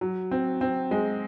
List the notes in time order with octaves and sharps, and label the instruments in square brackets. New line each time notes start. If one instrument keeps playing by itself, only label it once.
[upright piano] F#3
C4
C4
G#3